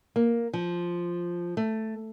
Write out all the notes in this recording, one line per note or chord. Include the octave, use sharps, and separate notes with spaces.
A#3
F3
A3